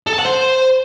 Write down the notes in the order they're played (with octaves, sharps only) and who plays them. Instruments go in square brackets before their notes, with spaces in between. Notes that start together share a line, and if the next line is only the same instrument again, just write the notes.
[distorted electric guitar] A4
A5
F#5
C5